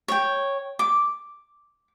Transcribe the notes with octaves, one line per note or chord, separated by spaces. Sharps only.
C#5 G5
D6